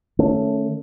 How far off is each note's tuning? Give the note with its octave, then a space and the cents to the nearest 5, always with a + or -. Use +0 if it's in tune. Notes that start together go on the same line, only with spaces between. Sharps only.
D#3 -35 A3 +0 C#4 +0